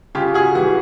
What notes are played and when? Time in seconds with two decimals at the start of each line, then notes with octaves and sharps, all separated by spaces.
0.15 C#3 F4 G4
0.34 F#4 G#4
0.55 E3 F#4
0.59 G3